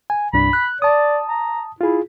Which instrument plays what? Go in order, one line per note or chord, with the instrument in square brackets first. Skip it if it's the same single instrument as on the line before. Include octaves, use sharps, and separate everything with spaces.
[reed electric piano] G#5
[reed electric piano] C2 G2 D4 [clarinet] B5
[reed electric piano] F#6
[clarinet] D5 [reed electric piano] A5 D#6
[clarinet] A#5
[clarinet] E4 [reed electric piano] F4 G#4